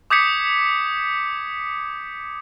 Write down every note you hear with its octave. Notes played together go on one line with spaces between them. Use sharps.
D6 D#6 G6 G#6 B6 C#7